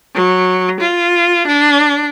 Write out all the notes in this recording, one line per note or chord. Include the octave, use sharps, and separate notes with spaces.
F#3
F4
D4